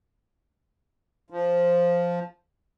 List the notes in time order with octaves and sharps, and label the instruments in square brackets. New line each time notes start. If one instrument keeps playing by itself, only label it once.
[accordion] F3